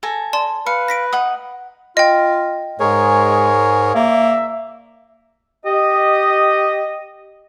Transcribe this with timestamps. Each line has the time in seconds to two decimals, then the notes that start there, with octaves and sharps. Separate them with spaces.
0.03 A4 G#5 A#5
0.33 D5 A5 C6
0.67 B4 F5 C#7
0.88 A#6 B6 D7
1.13 D#4 F#5 D#6
1.97 F4 D#5 G5
2.80 G#2 G#3 G#4 A#4 C#5
3.95 A#3 D5 E5
5.65 G4 D#5